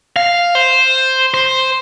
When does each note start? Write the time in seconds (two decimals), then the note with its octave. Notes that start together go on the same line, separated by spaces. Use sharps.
0.16 F5
0.55 C5
1.34 C5